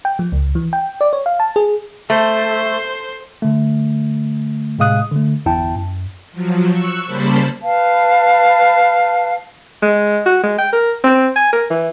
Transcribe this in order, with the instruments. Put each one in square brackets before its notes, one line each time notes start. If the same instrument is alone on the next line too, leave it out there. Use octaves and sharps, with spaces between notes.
[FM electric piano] G5
F3
C#2
E3
G5
D5
C#5
F5
A5
G#4
[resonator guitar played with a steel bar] A3 [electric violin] C5
[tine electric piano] D3 A3
A2 C3 G#3 F5 D#6 F#6
D3 A3
G1 E2 E4 G5 A5
F#2
[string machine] F3 F#3
C#6 E6 F#6
C#3 G3 A#3 C5 A5 B5
[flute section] B4 F5 A5
[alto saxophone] G#3
F#4
G#3
G5
A#4
C4
G#5
A#4
E3